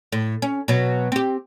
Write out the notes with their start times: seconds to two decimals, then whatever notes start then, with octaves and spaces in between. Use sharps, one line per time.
0.12 A2
0.42 C#4
0.68 B2 F#3
1.12 C4 G4